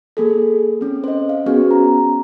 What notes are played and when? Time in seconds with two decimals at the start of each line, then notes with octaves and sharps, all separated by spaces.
0.17 A#3 G#4 A4
0.81 C4 C#4
1.04 C5 D#5
1.29 F5
1.46 B3 C#4 F#4 G#4
1.71 A#5